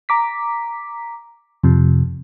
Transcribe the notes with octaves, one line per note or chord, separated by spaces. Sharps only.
A#5 D6 B6
F2 C3 F3